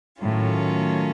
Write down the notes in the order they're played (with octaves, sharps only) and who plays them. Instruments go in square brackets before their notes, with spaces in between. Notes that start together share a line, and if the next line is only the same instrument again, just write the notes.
[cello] A2 [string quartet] D#3 F#3 A3 C#4 F4